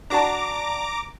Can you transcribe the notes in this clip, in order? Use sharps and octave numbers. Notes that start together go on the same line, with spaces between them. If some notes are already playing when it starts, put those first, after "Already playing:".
D4 F#4 A5 A#5 D6